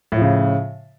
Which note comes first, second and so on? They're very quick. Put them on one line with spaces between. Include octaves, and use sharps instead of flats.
A2 F3 C#3